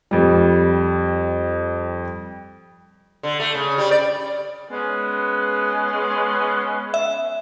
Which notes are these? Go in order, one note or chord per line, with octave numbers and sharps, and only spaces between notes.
F2 G3
D3
A3
C#3
G3
D5
G#3 B3 C#4
E5